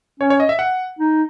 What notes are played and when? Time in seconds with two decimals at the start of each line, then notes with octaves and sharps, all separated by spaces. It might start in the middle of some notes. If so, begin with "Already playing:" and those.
0.20 C#4 C#5
0.30 C#5
0.40 D#5
0.49 E5
0.59 F#5
0.99 D#4